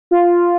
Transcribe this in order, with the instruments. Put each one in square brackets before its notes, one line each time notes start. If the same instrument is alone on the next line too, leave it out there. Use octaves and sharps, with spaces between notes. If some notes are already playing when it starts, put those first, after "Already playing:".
[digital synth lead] F4